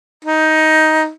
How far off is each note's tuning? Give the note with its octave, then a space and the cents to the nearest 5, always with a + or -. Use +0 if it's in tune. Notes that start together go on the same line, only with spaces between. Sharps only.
D#4 +10